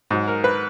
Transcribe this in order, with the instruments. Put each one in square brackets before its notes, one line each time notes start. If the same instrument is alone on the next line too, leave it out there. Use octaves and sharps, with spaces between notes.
[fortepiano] G#2 F#3
A#4
B4